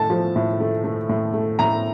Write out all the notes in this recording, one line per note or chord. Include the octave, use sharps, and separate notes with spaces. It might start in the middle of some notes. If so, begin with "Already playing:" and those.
Already playing: A2 A3 A5
F3
A2
A3
A3
A2
A3
A2 A#5